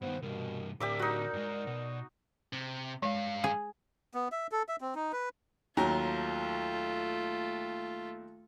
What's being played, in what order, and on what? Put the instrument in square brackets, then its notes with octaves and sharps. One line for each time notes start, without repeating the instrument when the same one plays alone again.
[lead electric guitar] G2 D#3 [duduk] B3 [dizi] C5
[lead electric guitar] C2 G2 [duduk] B2 [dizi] A#4
[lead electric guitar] A2 D3 [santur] G4 E5 D6 [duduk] A#4 [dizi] D5
[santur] D#4 F#4
[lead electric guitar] G2 G#3
B2
C3
[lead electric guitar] G2 F5 [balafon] G#3
[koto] G#4
[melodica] B3
E5
A4
E5
C4
D#4
B4
[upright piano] D#2 F#3 A#5 [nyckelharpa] A3 F4